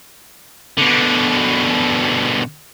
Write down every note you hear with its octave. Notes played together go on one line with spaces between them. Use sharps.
B2 D3